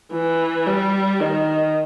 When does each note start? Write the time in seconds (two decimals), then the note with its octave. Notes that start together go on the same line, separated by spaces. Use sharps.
0.13 E3
0.67 G3
1.21 D#3